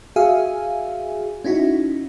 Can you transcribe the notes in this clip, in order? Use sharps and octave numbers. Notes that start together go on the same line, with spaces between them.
F#4 G#4 E5 F5 G#5
C#4 D#4 E4 F#4